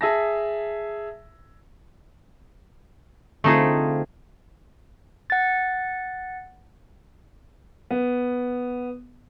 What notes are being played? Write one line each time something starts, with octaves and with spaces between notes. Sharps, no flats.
G#4 E5 A5 A#6
D3 A3 C4 D#4 F4 G#4
F#5 A6
B3